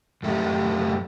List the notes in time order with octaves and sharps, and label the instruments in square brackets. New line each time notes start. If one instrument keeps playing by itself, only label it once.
[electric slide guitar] F#2 A3 E4 G4